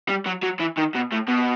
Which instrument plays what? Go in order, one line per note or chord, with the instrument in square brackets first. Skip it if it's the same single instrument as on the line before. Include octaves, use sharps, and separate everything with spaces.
[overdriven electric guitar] G3
F#3
F#3
E3
D#3
B2
A2
B2